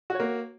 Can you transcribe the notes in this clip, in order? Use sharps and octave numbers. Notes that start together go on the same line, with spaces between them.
A#3 F#4 C#5